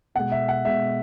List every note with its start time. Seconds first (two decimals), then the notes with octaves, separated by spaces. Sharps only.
0.15 B2 G#3 F#5
0.32 E5
0.49 F#5
0.65 B2 G#3 E5